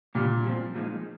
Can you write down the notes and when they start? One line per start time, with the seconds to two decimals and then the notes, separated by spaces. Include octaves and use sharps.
0.15 G2 A#2 D3 G3
0.45 G2 F3 C4
0.75 A#2 F3 G#3 D#4